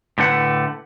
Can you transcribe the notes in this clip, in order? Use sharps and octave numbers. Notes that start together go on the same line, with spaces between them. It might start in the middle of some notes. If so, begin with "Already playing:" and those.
A2 D3 A3 B4 F#5